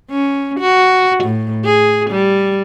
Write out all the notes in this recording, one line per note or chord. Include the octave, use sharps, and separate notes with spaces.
C#4
F#4
A2
G#4
G3